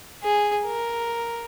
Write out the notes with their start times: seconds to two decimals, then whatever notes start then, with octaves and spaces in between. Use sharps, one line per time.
0.23 G#4
0.65 A#4